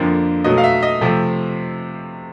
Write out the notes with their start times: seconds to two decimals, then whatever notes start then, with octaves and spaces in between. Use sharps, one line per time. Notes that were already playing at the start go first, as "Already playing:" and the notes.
Already playing: F2 D3 F3 A#3
0.44 B2 F#3 A3 D#5
0.58 F5
0.64 E5
0.83 D#5
1.01 C3 F3 A3 C4